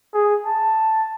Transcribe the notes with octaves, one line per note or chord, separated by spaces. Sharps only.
G#4
A5